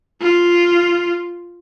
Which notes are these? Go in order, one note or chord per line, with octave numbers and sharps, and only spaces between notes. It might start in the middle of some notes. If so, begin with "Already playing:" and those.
F4